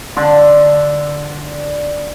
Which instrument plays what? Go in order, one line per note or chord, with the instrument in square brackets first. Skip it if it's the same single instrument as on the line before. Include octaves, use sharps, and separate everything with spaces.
[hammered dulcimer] D3 C6